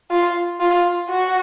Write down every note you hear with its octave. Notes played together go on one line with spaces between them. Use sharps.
F4
F4
F#4